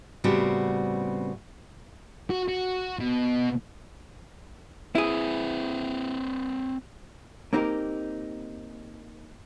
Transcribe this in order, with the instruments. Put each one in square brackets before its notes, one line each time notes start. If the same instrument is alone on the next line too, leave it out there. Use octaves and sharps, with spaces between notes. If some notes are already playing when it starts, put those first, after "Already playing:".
[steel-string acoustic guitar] A2 C#3 G3 B3 C4 F#4
[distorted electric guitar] F#4
F#4
B2
[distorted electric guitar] C4 B4 [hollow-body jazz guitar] E4 G#4
[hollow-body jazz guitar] A#3 C4 D#4 G4 A#4